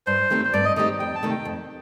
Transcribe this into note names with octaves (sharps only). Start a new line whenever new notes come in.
G2 C5
D#3 A3 C4 G4
C5
G2 D5
D#5
D#3 A3 C4 G4 D#5
F2 G5
A5
C3 D#3 A3
G5
F2